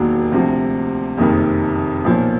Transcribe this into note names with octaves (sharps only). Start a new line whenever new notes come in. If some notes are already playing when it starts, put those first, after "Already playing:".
Already playing: E1 D#2 D#3 F#3 A#3
D2 C3 F3
F#1 F2 C3 D#3
B1 A#2 F3